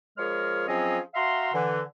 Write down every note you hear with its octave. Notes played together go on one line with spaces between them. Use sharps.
F3 G#3 G#4 A#4 C#5 F6
F3 F#3 C4 C#4 G#4 D#5
F#4 E5 F5 A#5 C6
D3 E3